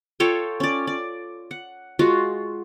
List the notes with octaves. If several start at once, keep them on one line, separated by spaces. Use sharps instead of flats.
F4 A4 C#5 G5
C#4 D5
D5
F#5
G#3 F4 F#4